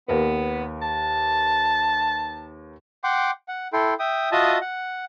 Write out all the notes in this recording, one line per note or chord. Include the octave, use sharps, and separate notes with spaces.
D#2 B3 A#4 B4
A5
F#5 G5 C6 D6
F#5
E4 A4 G5 C6
E5 G5 D#6
F4 F#4 D#5 E5 A5 D#6
F#5